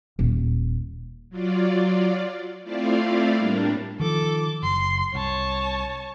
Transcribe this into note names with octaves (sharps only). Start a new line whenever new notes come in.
D#1
F#3 F4 D5
A3 C4 E4 F4 D5 F5
A2 G3 A#3 D4
D#3 F3 A4 D6
F#1 C6
C2 C#5 A5